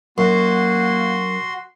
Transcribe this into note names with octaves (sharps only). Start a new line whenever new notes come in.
F#2 A#3 F#4 C6